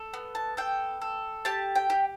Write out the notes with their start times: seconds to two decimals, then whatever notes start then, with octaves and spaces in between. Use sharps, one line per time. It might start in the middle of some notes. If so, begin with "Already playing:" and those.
Already playing: A4
0.13 B3
0.35 A5
0.57 A4 G5
1.01 A4
1.45 G4 A5
1.75 G5
1.90 G4